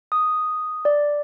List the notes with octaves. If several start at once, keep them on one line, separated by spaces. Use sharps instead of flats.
D#6
D5